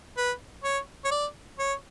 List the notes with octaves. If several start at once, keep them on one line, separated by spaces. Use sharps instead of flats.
B4
C#5
C#5
D5
C#5